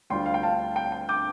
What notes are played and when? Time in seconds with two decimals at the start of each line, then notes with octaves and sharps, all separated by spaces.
0.10 D2 D3 G3 F4 G5 C6
0.26 F5
0.34 G5
0.43 F5 A5
0.76 G5
0.92 G5
1.09 D6 G6